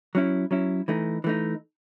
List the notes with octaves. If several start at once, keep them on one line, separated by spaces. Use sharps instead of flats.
F#3 C#4 E4
F#3 C#4 E4
E3 A3 D#4
E3 A3 D#4